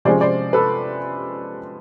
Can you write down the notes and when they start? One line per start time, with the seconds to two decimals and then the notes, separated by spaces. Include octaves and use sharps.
0.05 C3 F3 G#3 C#4 C5 D5
0.21 C5 D5
0.53 A4 B4